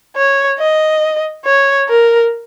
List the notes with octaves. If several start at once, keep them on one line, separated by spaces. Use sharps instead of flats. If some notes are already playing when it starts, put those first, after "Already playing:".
C#5
D#5
C#5
A#4